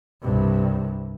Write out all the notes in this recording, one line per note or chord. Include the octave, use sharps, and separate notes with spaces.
C2 G2